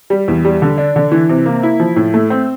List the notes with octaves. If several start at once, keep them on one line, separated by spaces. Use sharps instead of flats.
G3
E2
G3
D3
D4
D3
E3
C3
A#3
E4
F3
A2
A3
C4